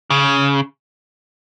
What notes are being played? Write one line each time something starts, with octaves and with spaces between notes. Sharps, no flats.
C#3